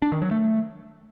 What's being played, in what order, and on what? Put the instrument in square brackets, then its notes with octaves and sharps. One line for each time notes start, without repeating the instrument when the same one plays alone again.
[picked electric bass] D4
D#3
F#3
A3